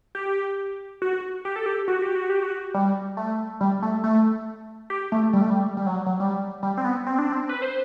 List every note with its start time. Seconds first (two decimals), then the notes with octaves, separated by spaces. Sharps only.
0.15 G4
1.02 F#4
1.45 G4
1.56 A4
1.66 G4
1.88 F#4
2.02 G4
2.15 F#4
2.30 G4
2.43 F#4
2.74 G3
3.17 A3
3.61 G3
3.82 A3
4.04 A3
4.90 G4
5.12 A3
5.33 G3
5.41 A3
5.50 G3
5.77 G3
5.87 F#3
6.06 F#3
6.20 G3
6.63 G3
6.77 C4
6.84 B3
7.07 C4
7.19 D4
7.32 C4
7.49 B4
7.62 C5